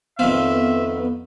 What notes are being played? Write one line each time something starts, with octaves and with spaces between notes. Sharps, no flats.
F2 D#3 B3 C4 E5 F5